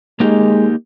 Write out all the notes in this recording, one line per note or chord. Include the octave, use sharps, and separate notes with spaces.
G#3 A#3 D#4 G4